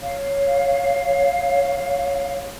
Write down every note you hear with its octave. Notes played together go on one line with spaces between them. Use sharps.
C#5 F5